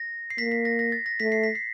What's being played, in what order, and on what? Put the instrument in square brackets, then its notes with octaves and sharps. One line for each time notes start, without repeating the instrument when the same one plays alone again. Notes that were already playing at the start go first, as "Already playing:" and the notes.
Already playing: [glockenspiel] A#6
C7
[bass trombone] A#3 [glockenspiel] B6
[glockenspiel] B6
A#6
A#6
A6
A#6
[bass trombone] A3 [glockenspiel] B6
[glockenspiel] C7
B6
C7